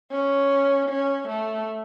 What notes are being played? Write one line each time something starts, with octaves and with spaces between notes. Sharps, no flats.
C#4
C#4
A3